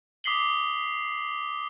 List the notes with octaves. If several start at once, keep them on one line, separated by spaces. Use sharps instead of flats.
D6 D#6 B6 C7 F#7 G7